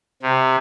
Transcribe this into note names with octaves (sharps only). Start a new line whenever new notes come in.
C3